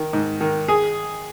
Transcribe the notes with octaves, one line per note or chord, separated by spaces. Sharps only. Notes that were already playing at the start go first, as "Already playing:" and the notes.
Already playing: D#3
G#2
D#3
G#4